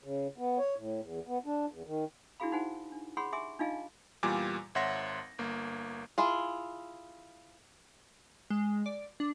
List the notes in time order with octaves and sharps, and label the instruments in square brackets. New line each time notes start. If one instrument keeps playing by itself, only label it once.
[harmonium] C#3
B3
C#5
A2
E2
B3
D4
E2
D#3
[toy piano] D4 E4 F#4 G#4 F5 B5
D#4 F#4 C5 F#5 G#5
D4
G#4 C#5 F#5 B5 C6
G4 E5 G#5 C6 D6
D4 D#4 F4 D#5 F5 G#5
[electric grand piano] E2 A#2 G3 F4 G#5 D6
G#1 C#5 E5 F#5 C6 A#6
G1 A#3
[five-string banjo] E4 F4 G#4
[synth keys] G#3
D5
D4